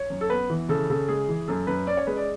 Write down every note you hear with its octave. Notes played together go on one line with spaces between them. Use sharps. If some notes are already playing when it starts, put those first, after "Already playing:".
Already playing: C#5
F#2
A4
B3 B4
E3
C#3 A4
C#3 A4
G#3 G#4
E3
F#2 A4
F#2 B4
C#4 D5
C#5
G#3 B4
D5